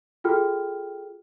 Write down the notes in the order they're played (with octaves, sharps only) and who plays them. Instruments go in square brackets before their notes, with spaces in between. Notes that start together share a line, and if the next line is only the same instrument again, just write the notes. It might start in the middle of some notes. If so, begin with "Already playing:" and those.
[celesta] F4 F#4 G#4 A4 G5 F6